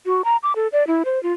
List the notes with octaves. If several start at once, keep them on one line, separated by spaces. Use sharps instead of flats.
F#4
A#5
D6
A4
D5
E4
C5
F4